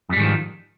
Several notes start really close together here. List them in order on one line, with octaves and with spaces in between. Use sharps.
F2 G3 G#2 D#3 F3